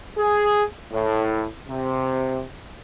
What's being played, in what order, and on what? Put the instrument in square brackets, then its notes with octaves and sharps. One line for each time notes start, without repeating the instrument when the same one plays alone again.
[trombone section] G#4
A2
C3